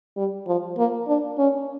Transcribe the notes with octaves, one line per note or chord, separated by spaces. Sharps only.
G3
F3
A#3
D4
C#4